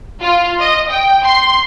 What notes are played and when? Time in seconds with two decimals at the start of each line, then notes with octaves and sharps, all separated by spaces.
0.22 F4
0.60 D#5
0.91 G5
1.24 C6